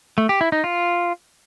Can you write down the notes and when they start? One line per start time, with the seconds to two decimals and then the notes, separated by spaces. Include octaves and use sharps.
0.18 A3
0.29 G4
0.41 E4
0.52 D#4
0.64 F4